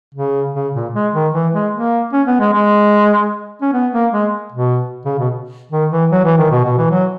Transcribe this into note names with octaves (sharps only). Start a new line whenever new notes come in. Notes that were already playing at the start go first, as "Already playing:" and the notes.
C#3
C#3
A#2
G#3
D#3
E3
G#3
A#3
C#4
B3
G#3
G#3
C#4
B3
A#3
G#3
B2
C#3
B2
D#3
E3
F#3
E3
D#3
B2
B2
E3
F#3